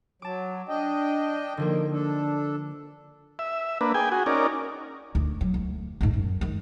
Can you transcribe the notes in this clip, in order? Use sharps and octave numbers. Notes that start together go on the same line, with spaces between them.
F#3 A5 D6
D4 D#5 G5
D3 D#3 F3 A#3
D4 A4
E5
A#3 D4 B4
G#4 G5 G#5
F#4 G#4
C#4 D#4 A#4 D5
D2
F#3
D2
D2 G#2
F#2
D#3 G#3